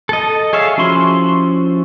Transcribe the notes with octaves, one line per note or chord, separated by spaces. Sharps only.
A4 D#5
G#4 C#5 E5 F5
F3 C#4 E4 F#4 C6